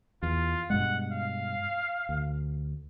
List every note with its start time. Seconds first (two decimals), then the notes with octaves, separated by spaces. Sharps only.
0.23 E2 F4
0.70 G2 B2 G#3 F#5
1.12 F5
2.09 D2